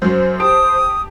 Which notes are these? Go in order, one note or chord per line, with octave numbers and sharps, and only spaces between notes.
F#2 F#3 C5
G4 A5 D#6 D7